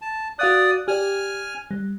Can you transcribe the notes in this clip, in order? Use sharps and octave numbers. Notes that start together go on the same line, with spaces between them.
A5
F#4 D5 F5 D#6 F#6
G4 D5 G#5 F6
G3